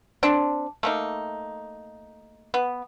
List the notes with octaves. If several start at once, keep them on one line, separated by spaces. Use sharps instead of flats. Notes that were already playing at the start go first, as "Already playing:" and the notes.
C4 D4
A3 A#3 D#4
B3